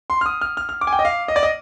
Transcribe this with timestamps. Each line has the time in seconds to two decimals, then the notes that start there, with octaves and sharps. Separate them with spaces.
0.10 C6
0.21 F6
0.26 D#6
0.41 F6
0.57 F6
0.69 F6
0.81 D6
0.87 G#5
0.93 G5
0.99 D#5
1.05 F5
1.28 D#5
1.36 D5
1.43 D#5